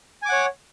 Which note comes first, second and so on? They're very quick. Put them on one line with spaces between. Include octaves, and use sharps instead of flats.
G#5 D6 F#5 C#5